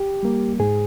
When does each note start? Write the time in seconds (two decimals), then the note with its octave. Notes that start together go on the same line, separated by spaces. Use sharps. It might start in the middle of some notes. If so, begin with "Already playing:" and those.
Already playing: G4
0.23 G3 A#3
0.60 G#2 G#4